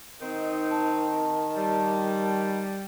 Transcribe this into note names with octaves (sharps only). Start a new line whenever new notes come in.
D#3 C4 D#4
A5
G3